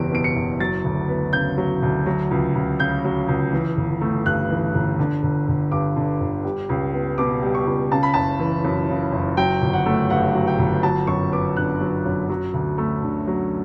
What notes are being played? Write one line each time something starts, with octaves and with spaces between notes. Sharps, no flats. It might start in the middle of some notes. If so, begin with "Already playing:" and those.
Already playing: F#1 E2 B2 G3 D7
B2 D7
C#7
F#1
F#3 A6
D2
B3
C#3 G6
F#3
D2
F#3
C#2
C#2
C#3 G6
F#3
C#2
E3
G1
A3
G2 F#6
E3
G1
D3
G1
G1
G2 D6
D3
G1
G3
C#2
B3
B2 D6
G3
C#6
C#2
C#3 A5
B5
F#1 A5
E3
F#2
C#3
F#1
F#3 G5
G1
F#5
A3
G2 F#5
F#3
G5
G1
F#3 A5
F#2 C#6
B3 D6
D3 F#6
F#3
F#2
F#3
D2
A3
D3
F#3